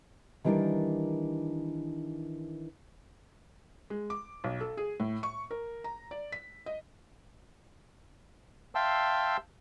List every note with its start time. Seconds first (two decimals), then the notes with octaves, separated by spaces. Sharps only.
0.44 D#3 E3 G3 D4 A#4 D5
3.90 G#3
4.10 D6
4.44 B1
4.61 A4
4.77 G#4
5.00 A2
5.23 C#6
5.51 A#4
5.84 A#5
6.11 D5
6.32 B6
6.66 D#5
8.75 E5 F5 G5 A5 C6 E6